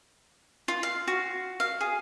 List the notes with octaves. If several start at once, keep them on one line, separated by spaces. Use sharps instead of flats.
F4
F5
F#4
F5
G#4